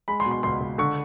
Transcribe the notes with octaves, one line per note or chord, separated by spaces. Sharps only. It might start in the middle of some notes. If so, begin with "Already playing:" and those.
G#3 B5
C6
B2
C6
C#2 C6
C#2
D3 C#6